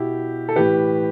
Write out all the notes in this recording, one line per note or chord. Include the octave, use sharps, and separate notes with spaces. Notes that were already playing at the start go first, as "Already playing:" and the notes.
Already playing: B2 E4 G4
A4
A2 E3 G4 B4